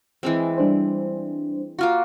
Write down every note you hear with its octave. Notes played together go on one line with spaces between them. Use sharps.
E3 G#3 C4
G3 D4 C5
A#3 F4 F#4